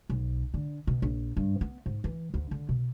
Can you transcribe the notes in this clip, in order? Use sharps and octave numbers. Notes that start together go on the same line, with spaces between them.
B1
D3
B2
A#1
G2
B3
G#2
E3
D2
D3
B2